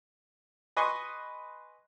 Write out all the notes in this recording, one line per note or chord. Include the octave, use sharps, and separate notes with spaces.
B4 D#5 G#5 C6 C#6